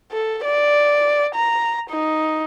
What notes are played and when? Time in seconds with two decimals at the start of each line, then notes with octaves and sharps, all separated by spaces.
0.12 A4
0.45 D5
1.35 A#5
1.90 D#4